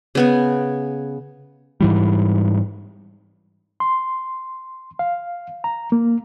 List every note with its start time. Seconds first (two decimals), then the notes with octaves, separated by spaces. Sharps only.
0.15 C#3 B3 G#5
1.80 G#2 E3 G3
3.80 C6
4.99 F5
5.64 A#5
5.92 A#3